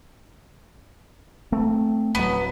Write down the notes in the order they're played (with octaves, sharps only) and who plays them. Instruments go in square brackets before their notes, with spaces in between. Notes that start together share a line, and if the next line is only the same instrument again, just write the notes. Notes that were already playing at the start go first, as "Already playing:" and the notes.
[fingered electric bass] A3 C4
[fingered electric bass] D1 F#3 [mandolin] B3